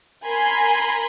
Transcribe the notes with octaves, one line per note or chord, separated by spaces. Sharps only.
A#4 G#5 B5 C6